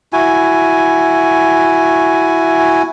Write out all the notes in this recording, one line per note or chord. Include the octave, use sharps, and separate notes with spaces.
E4 F#4 G#5